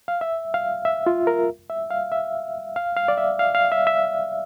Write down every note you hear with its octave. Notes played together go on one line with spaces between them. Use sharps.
F5
E5
F5
E5
F4
A#4
E5
F5
E5
F5
F5
D5
E5
F5
F5
E5
E5